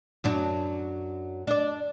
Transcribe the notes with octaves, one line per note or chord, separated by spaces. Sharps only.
F#2 F#3 D4
D4 D5